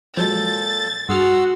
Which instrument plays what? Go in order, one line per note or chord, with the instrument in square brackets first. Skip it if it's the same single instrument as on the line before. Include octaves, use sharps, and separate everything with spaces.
[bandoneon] A#2 A4 G6 [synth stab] F3 F#3 G#3 [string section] A6
[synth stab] G2 G#4 F6 [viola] F#4 [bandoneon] F#5 C6 E6